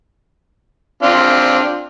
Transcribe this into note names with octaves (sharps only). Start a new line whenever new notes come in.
C4 D4 F4